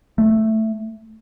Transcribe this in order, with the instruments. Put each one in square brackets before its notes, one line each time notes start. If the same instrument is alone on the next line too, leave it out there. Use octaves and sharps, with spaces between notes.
[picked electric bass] A3